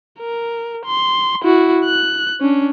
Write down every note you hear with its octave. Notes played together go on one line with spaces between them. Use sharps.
A#4
C6
E4 F#4
F#6
C#4 D4